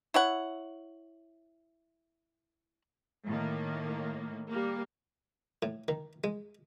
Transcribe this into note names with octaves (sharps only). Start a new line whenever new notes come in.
E4 C#5 F#5
A2 D#3 A#3
G3 A#3
A2
D#3
G#3